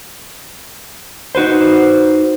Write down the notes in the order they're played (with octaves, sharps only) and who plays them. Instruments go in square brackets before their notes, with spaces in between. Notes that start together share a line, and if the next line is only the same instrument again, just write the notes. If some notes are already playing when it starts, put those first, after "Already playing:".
[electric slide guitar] D#4 F#4 B4 C5